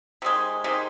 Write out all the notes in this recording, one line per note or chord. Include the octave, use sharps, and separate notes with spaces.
C3 D#3 G#3
C3 D#3 G#3